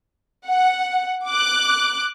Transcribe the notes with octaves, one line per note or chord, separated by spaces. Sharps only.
F#5
D6 F#6